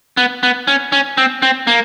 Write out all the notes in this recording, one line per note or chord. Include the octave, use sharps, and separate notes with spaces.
B3
B3
C#4
C#4
C4
C4
A#3